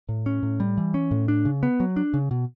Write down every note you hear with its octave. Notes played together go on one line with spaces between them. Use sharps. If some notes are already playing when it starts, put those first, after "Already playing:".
A2
C#4
A2
G3
E3
C#4
A2
D4
C#3
B3
F#3
D4
C#3
B2